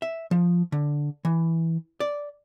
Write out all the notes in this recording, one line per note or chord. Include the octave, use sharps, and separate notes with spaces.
E5
F3
D3
E3
D5